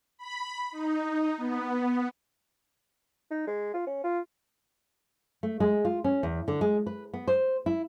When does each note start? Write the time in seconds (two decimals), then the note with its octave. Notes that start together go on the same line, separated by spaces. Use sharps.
0.18 B5
0.71 D#4
1.37 B3
3.31 D#4
3.47 G#3
3.74 F4
3.87 C#4
4.04 F4
5.43 A3
5.60 G#3
5.85 F4
6.04 C#4
6.23 E2
6.48 D3
6.61 G#3
6.86 B4
7.14 B3
7.28 C5
7.66 E4